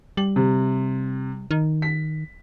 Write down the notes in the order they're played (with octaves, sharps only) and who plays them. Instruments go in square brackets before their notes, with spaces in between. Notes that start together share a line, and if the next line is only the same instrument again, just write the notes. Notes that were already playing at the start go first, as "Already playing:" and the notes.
[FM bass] G3 [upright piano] F#7
[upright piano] C3
[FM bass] D#3
[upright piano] B6